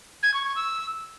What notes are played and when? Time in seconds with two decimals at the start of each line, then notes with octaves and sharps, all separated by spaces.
0.23 G#6
0.34 C#6
0.45 C#6
0.56 E6